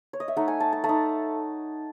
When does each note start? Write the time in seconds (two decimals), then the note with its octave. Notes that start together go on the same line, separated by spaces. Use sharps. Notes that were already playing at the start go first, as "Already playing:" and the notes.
0.13 C#5
0.20 D#5
0.28 E5
0.37 A3 D#4 F#5
0.48 G#5
0.60 A5
0.73 A5
0.84 A3 A5
0.89 D#4